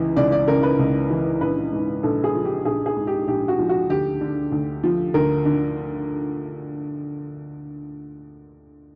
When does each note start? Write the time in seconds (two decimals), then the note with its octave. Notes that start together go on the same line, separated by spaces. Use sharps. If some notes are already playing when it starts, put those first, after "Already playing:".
Already playing: C#2 E3
0.16 C#2 D5
0.32 D5
0.47 C#3 A#4
0.63 B4
0.79 C#2
1.10 E3
1.41 A#1 B4
1.72 G#2
2.03 A#1 A4
2.24 G#4
2.34 F3
2.44 G4
2.65 A#1 G#4
2.86 G#4
2.97 G#2
3.07 G4
3.28 A#1 G4
3.48 F#4
3.59 F3
3.69 F#4
3.90 D2 G4
4.21 D3
4.52 D2
4.84 F3
5.14 D2 A#4
5.45 D3